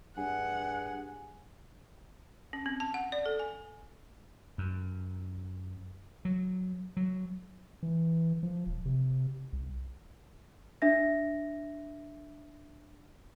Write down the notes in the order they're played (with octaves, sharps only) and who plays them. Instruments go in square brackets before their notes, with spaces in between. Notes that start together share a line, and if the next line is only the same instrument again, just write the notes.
[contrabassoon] G2 [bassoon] G#4 [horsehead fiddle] F#5
[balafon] C#4
C4
A5
F#5
D5
A4
G#5
[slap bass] F#2
F#3
F#3
[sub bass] E3
F3
D#1
C3
C2
[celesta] D4 E5 A#6